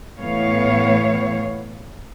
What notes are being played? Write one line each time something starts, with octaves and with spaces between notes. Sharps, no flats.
A2 E3 B3 C#5 F5